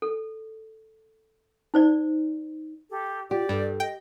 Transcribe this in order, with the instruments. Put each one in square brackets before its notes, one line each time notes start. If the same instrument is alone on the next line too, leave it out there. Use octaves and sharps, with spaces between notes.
[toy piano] A4
D#4 C5 D5
[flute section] G4 A4
[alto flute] F4 [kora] G4 [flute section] D5
[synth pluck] G2 [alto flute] A4
[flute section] D#5 [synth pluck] G5